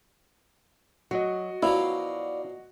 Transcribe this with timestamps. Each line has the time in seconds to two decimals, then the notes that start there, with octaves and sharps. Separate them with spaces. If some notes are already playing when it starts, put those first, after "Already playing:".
1.11 F#3 F#4 D#5
1.63 B2 F3 F#3 E4 D5 F5